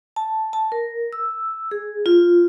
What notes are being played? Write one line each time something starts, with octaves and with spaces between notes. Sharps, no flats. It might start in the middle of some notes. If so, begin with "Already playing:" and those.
A5
A5
A#4
E6
G#4
F4